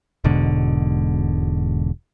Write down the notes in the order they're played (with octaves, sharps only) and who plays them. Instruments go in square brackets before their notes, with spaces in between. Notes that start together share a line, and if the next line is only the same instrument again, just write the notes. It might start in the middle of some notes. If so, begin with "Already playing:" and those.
[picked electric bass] E1 G#2 B2 D3